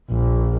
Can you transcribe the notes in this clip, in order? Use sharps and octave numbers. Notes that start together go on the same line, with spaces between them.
A#1